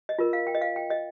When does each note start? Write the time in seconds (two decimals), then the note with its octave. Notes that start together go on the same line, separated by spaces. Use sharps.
0.09 D#5
0.19 F4 A#4
0.33 F5
0.47 G5
0.55 D#5
0.61 F5
0.76 G5
0.90 D#5